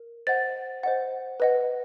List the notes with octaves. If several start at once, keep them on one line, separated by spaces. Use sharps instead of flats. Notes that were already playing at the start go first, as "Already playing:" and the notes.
Already playing: A#4
C5 D#5 F#5 A6
C5 D#5 F#5
B4 D#5 F#5